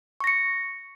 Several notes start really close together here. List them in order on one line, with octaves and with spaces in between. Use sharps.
C#6 A#6 C#7